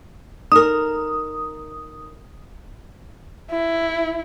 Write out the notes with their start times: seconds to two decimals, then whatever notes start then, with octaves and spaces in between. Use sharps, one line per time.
0.52 D#4 A#4 D#6
3.51 E4